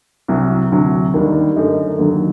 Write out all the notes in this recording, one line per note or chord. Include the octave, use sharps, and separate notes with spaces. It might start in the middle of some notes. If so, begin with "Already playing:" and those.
C2 C3 F#3
D2 C3 F#3
D#2 D#3 G3 D4
F#2 D3 A3 D#4
D#2 D3 F#3